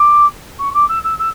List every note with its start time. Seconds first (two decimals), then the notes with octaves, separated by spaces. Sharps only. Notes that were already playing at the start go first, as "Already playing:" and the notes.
Already playing: D6
0.59 C#6
0.74 D6
0.89 E6
1.04 E6
1.19 E6